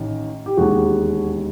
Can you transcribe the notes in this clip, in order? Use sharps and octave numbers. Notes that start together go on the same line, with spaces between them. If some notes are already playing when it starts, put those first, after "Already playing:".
Already playing: A1 D#3
G4
E1 D#2 D#3 F#4 G#4